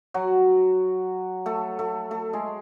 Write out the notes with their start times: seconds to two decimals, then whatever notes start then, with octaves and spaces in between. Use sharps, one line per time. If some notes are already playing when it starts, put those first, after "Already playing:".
0.14 F#3 F#4
1.46 A3 A4
1.79 A3 A4
2.11 A3 A4
2.33 G#3 G#4